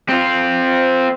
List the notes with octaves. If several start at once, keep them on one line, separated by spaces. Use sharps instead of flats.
C4 F4